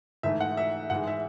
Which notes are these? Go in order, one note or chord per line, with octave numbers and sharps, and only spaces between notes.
G#2 E3 A3 E5
F#5
E5
G#2 E3 G#3 F#5
E5